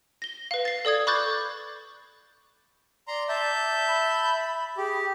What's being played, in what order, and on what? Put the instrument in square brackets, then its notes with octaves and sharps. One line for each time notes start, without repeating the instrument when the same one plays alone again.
[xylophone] A#6 G7
B4 F5
A6 C7
A4 D5 D#6 G#6
B5 C#6 D6 F#6 G6 A6
[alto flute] D5 [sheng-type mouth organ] A#5 C6
[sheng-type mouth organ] E5 A5 G6
[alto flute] B5
[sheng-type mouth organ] G4 [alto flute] G#4